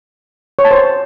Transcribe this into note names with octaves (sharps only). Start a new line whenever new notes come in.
C#5
A5
C5